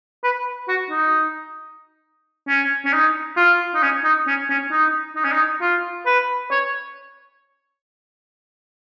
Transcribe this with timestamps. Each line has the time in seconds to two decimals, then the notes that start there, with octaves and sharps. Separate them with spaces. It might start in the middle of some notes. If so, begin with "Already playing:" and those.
0.24 B4
0.68 F#4
0.90 D#4
2.48 C#4
2.85 C#4
2.93 D#4
3.37 F4
3.75 D#4
3.83 C#4
4.04 D#4
4.27 C#4
4.49 C#4
4.71 D#4
5.16 D#4
5.24 C#4
5.32 D#4
5.61 F4
6.06 B4
6.51 C#5